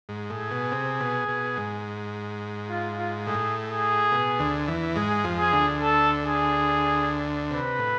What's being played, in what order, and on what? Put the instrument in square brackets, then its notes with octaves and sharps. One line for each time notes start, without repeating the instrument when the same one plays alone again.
[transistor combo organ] G#2
[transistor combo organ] A2 [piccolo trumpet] G#4
[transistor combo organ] B2
C3
B2
B2
G#2
[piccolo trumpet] F4
F4
[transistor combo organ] A2 [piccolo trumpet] G#4
[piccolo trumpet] G#4
[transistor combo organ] B2
D2 D3
E2 E3
[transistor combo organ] G#2 G#3 [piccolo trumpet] G#4
[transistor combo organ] F2 F3
[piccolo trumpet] G#4
[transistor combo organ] D2 D3
[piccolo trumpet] A4
G#4
[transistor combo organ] C3 [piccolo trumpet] B4
[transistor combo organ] A2